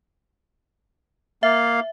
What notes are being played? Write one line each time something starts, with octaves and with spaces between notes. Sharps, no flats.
A#3 E5 F5